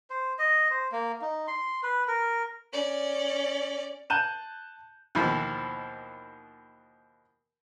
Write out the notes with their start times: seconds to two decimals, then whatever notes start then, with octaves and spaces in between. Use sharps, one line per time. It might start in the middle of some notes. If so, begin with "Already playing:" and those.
0.10 C5
0.39 D#5
0.71 C5
0.92 A#3
1.22 D#4
1.48 C6
1.83 B4
2.08 A#4
2.73 C#4 D5
4.10 A5 F#6 G6 D#7 E7
5.15 D#2 B2 E3 F3